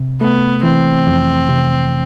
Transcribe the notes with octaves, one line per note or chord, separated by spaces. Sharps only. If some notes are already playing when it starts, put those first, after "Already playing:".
Already playing: C3
A3 B3
E3 C4
F2
C3